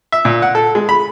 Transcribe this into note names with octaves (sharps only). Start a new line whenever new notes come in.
E5
A#2
F#5
A4
G#3
B5